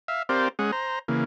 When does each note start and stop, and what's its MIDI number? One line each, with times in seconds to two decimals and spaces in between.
0.08 0.23 76
0.08 0.23 77
0.29 0.48 60
0.29 0.48 67
0.29 0.48 70
0.29 0.48 72
0.29 0.48 74
0.29 0.48 77
0.59 0.71 56
0.59 0.71 61
0.59 0.71 68
0.59 0.71 78
0.72 0.99 72
0.72 0.99 82
1.08 1.24 49
1.08 1.24 52
1.08 1.24 58